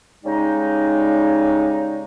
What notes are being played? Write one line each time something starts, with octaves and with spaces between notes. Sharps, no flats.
C#3 G3 G#3 D#4